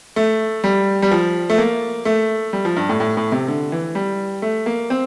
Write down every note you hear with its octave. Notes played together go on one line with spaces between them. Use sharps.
A3
G3
G3
F3
A3
A#3
A3
G3
F3
G2
A2
A2
A2
C3
D3
E3
G3
A3
A#3
C4